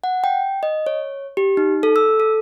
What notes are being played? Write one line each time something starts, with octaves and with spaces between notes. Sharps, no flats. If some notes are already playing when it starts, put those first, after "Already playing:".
F#5
G5
D#5
C#5
G4
D#4
A4
E6
A4